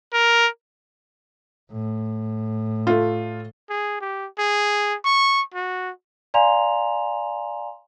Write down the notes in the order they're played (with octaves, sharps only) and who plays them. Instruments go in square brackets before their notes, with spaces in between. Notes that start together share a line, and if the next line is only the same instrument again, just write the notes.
[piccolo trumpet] A#4
[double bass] A2
[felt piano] A3 F4
[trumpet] G#4
G4
G#4
C#6
F#4
[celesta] D5 F5 G#5 A#5 C6 F7